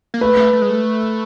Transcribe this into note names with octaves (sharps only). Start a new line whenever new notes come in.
A#3
A3 B4
A3
A3
G#3
A3